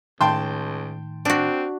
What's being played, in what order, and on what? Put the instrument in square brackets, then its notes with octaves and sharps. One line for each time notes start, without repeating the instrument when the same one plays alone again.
[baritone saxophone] C#2 [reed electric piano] A2 D#3 [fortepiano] G5 A5 C6
[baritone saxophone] C4 [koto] D4 F#4